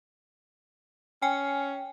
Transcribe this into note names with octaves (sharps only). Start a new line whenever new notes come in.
C#4 G5 G#5